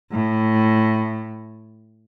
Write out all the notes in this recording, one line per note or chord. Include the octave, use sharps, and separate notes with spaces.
A2